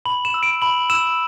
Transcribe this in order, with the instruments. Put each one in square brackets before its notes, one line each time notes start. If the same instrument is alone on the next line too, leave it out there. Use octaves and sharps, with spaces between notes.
[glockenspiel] B5 F#7
E7
E6
D7
B5 F#7
E6 E7